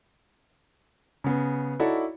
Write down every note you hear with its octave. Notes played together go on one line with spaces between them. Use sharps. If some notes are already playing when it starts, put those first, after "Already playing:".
C#3 B3
D#4 E4 F#4 A4 C#5 D5